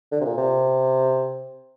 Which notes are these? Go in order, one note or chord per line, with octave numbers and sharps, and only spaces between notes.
D3
C3
A#2
C3